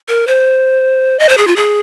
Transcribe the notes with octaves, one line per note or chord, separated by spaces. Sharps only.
A#4
C5
D#5
C5
G#4
F4
G#4